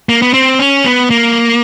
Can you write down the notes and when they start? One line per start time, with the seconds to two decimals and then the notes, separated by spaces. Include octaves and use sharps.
0.09 A#3
0.22 B3
0.34 C4
0.59 C#4
0.85 B3
1.10 A#3